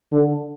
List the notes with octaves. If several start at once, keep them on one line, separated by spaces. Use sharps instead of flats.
D3